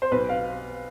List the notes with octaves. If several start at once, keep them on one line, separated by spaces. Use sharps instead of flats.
C5
B1 B4
F5